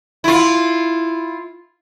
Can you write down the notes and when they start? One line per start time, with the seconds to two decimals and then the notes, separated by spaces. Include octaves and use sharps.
0.24 E4 F4